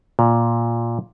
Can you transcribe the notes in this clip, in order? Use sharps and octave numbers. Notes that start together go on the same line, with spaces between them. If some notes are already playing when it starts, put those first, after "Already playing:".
A#2